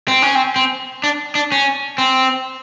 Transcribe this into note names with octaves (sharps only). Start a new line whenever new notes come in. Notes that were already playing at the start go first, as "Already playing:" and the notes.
C4
C#4
C4
C4
D4
D4
C#4
C4